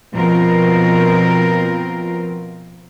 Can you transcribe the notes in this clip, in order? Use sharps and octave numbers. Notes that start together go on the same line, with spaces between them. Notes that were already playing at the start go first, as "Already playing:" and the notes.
B2 F3 C4 F4 A#4